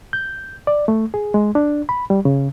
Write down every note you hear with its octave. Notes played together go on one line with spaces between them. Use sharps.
G6
D5
A3
G#4
G#3
D4
B5
G3
C#3